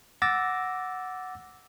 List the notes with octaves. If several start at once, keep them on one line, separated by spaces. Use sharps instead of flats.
F#5 D6 E6 A6 A#6